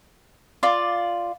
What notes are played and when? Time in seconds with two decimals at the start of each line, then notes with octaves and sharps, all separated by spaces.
0.63 F4 D5